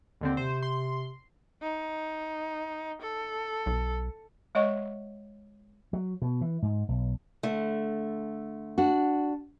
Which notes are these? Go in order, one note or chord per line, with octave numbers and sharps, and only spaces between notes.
D#2 D3 C4
C3 C5
C6
D#4
A4
B1
G#3 C#5 D#5 F#5 C#6
F#3
B2
E3
G#2
B1
D3 A3
D4 F#4